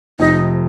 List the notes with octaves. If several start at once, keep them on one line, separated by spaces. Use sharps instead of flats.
F1 F2 C3 D#4